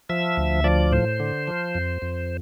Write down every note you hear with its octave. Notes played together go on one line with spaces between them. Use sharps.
F3 E5
D2
F3 D5
A2 C5
D3
F3
F2
F2